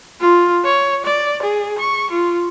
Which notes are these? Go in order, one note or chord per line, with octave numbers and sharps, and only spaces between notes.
F4
C#5
D5
G#4
C#6
F4